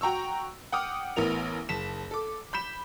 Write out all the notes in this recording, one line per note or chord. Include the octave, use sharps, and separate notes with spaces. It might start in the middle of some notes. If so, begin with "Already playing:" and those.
F#4 G5 A#5 C#6 E6
F#5 G5 D6 D#6 F6
A1 E3 B3 A#4 F7
F#1 A5 B6 E7
A4 D6
B5 G6 B6 E7